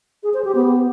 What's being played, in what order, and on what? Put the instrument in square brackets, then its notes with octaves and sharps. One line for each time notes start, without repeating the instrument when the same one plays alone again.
[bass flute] G#4
C5
G4
B3